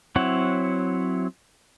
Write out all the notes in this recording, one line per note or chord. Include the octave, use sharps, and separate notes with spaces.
F#3 C4 E4 C#5 F#5